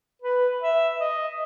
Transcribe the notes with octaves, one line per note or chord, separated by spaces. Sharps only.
B4
E5
D#5